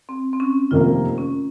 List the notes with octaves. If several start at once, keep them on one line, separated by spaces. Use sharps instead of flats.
C4
C4
C#4
F1 F2 D#3 A#3 F4
C#4